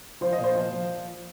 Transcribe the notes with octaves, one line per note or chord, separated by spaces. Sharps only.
F3 C5
D#5
A#2
C5
F3
F3